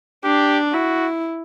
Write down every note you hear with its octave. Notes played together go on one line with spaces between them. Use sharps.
D4 G4
E4 F#4